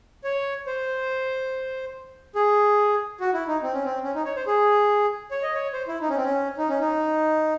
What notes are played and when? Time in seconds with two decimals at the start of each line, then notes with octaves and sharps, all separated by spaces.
0.24 C#5
0.67 C5
2.35 G#4
3.21 F#4
3.34 E4
3.48 D#4
3.62 C4
3.73 C#4
3.85 C4
4.04 C#4
4.15 D#4
4.25 C#5
4.36 C5
4.47 G#4
5.31 C#5
5.43 D#5
5.55 C#5
5.73 C5
5.88 E4
6.01 D#4
6.09 C#4
6.17 C4
6.24 C#4
6.58 D#4
6.69 C#4
6.80 D#4